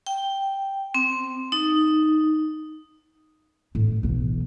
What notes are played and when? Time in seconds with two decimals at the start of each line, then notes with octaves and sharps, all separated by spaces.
0.07 G5
0.94 C4
1.52 D#4
3.75 A2
4.03 B1 E3